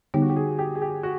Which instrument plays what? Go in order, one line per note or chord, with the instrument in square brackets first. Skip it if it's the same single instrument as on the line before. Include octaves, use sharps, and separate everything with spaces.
[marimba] D3 G3 B3 D#4 [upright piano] G4
[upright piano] F#4
G4
G#4
G4
G#4
G4
F#4